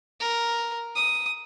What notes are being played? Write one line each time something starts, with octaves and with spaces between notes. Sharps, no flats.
A#4
D#6